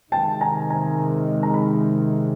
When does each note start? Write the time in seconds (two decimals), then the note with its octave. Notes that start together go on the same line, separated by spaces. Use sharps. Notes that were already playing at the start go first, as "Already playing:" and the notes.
0.12 C3 D#3 G#3 G5 A5
0.40 G#5 A#5
0.70 G#5 A#5
1.43 A#5
1.54 B5